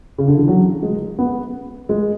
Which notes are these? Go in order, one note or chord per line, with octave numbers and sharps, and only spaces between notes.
C#3
D3
E3
F#3
G#3
B3
G#3